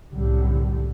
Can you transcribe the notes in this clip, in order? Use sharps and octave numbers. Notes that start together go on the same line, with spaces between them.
C2 F#2 A2 D3 G3